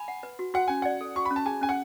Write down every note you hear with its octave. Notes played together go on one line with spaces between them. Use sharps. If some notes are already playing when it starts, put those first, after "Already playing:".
Already playing: G#5 B5
F#5
B4
F#4
F#4 F#5
C#4 G#5
D5 F#5
A4
F#4 C#6
C#4 B5
A5
G#4 G#5
C#4 G#5
F#5